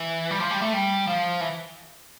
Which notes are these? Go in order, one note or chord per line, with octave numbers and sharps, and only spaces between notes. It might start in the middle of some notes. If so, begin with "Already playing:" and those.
Already playing: E3
G3
F3
G3
A3
G3
F3
E3